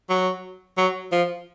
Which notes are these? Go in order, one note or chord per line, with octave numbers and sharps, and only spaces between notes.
F#3
F#3
F3